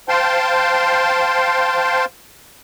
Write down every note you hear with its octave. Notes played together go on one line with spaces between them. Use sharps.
C5 F5 G5 A5 C6